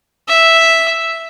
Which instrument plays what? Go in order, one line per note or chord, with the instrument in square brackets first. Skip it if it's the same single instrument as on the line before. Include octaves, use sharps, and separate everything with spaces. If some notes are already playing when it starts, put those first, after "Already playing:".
[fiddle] E5